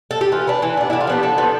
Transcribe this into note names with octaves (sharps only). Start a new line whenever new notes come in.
A4
G4
E3 F4
B3 D4
E3
B3 D4
D3 E4
F4
F3 B3 D4 G4
D3 A4
F3 B3 D4